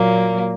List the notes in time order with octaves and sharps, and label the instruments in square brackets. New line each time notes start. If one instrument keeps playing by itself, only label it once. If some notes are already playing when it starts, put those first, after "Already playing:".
Already playing: [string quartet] A#2 F#3 A#3